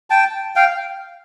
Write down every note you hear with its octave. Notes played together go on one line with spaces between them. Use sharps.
G5 A5
F5 G5